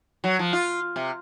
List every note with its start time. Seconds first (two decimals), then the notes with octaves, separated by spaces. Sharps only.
0.24 F#3
0.39 F3
0.53 F4
0.96 C3